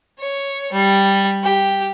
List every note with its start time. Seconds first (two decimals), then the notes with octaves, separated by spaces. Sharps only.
0.19 C#5
0.71 G3
1.43 G4